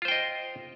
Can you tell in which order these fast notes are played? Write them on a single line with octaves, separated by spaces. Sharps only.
F4 C5 G5 D#5